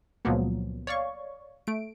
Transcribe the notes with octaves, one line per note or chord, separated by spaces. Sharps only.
C#2 A#2 F3 F#3 A#3 B3
C#5 D5 F5 C#6
A3 D7